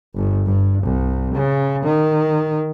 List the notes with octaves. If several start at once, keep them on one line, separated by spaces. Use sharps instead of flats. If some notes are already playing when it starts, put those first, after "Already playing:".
G1
G2
C2
C#3
D#3